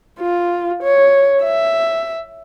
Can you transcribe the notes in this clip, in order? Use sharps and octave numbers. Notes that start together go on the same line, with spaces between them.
F4
C#5
E5